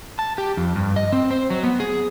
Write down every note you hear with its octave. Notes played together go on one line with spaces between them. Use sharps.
A5
G4
F2
G2
D#5
C4
C5
F#3
B3
G#4